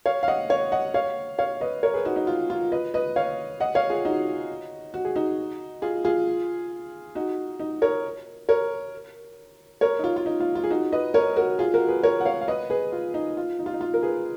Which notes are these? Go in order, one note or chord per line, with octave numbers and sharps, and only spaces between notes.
C#5 F5
F5
D#5 F#5
C#5 F5
D#5 F#5
C#5 F5
C#5 F5
B4 D#5
A#4 C#5
G#4 B4
D#4 F#4
D#4
F4
F4
B4 D#5
B4 D#5
C#5 F5
D#5 F#5
C#5 F5
F4 G#4
D#4 F#4
F#4
G#4
D#4 F#4
F4 G#4
F4 G#4
D#4 F#4
D#4
A#4 C#5
A#4 C#5
A#4 C#5
D#4
F4
F4
D#4
F4
F4
G#4
D#4 F#4
B4 D#5
A#4 C#5
F#4 A#4
F4 G#4
F#4 A#4
G#4 B4
A#4 C#5
F#5
C#5 F5
F5
B4 D#5
G#4 B4
F4
D#4
F4
D#4
F4
D#4
F4
A#4
G#4 B4